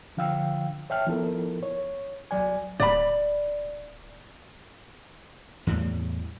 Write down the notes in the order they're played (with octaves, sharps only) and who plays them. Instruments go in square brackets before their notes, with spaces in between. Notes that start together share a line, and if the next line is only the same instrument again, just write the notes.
[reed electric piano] D3 F3 F5 G5 E6
C#5 E5 G5 A5 F6
F3 B3 E4 A4 A#4
C#5
C2 F#3 D5 G#5
[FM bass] D1 [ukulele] D5 B5
[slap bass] E2 A2 G3